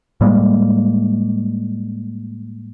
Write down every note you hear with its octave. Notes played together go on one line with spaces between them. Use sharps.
A2 G3 G#3 A#3